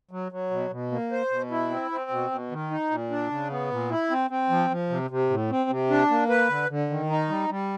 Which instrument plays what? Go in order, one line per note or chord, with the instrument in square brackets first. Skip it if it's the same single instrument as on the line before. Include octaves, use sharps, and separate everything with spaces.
[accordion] F#3
F#3
B2
B2
A#3
C5
B2
E4
C4
C4
B2
B2
D#3
D#4
A#2
D4
C#3
B3
A#2
E4
C4
C4
F3
F3
C3
C3
A2
C4
C3
D4
A#3
B4
D3
D3
D#3
D#4
G3
G3